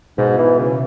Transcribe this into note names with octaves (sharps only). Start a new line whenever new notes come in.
G#2 B2
E3
C#3 E3